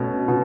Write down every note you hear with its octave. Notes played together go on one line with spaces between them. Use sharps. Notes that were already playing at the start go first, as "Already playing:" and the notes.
Already playing: B2 A3 C#4
B2